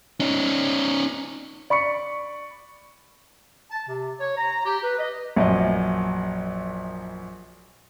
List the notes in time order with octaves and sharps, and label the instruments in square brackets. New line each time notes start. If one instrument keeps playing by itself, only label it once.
[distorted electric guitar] C#4 D#4
[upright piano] D5 B5 C#6 C#7
[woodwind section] A5
C3
C#5
A#5
G4
B4
D#5
[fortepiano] A#1 F#2 D#5